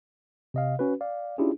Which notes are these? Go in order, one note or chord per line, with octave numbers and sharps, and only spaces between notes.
C3 D#5 F5
C#4 F#4 B4
D5 F5
C#4 D4 E4 F4 G4 G#4